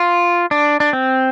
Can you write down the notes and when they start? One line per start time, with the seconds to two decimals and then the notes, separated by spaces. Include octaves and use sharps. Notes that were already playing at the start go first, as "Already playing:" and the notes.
Already playing: F4
0.51 D4
0.80 D4
0.93 C4